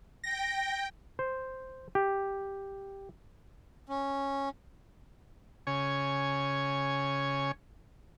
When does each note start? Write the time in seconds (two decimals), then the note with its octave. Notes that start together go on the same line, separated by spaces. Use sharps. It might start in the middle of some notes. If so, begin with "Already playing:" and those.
0.24 G5 A#6
1.19 C5
1.95 G4
3.89 C#4
5.67 C#3 C#5 G#5